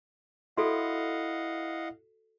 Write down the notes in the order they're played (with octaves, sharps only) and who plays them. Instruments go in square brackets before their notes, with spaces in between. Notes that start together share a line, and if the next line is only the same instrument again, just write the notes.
[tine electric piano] E4 [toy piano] F#4 A4 [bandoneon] D#5 F5 F#5